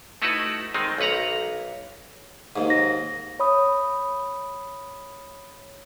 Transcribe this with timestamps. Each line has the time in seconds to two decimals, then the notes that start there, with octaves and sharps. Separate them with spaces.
0.22 A3 D#4 E4 F#4 A4 B4
0.74 D#3 G#3 C4 D#4
0.98 B1 A#3 B4 F#5 A#5
2.56 D#2 G#2
2.70 A#6
3.40 C#5 B5 D#6